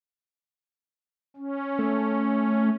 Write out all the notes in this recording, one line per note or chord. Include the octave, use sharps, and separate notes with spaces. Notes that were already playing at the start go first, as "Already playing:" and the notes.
C#4
A3